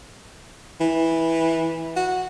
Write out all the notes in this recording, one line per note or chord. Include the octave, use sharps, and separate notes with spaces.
E3
F#4